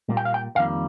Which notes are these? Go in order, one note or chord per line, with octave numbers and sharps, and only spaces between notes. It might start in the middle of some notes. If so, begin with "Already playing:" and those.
A#2 G3 A#3
G5
F5
G5
F2 D#3 G3 A#3 F5